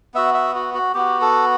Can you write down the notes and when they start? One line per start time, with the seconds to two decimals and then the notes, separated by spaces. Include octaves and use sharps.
0.14 B3 F#4 E5
0.34 E5
0.55 F#4
0.74 F#4
0.94 B3 F#4 G4
1.21 A4